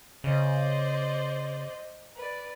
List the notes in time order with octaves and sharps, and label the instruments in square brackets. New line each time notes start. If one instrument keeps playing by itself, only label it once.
[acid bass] C#3 [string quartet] C5 D5 D#5
[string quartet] B4 D5